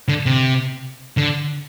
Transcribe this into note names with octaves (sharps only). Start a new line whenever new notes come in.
D3
C3
D3